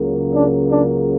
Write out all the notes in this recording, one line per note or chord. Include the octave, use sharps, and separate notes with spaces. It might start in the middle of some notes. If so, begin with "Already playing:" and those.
Already playing: C#2 C#3 F#3 A#3
D4
D4